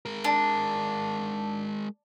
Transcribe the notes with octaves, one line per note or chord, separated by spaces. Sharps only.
G#3 A#4
D4